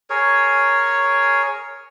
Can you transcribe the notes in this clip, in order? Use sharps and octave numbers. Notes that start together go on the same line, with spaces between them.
G#4 A#4 C#5